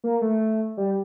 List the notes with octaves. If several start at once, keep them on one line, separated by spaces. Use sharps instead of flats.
A#3
A3
G3